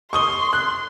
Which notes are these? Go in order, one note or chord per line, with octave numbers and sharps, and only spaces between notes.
C6 C#6 D#6 G7
F#6